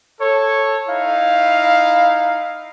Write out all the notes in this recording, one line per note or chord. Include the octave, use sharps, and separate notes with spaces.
A4 C#5
D#4 E4 F5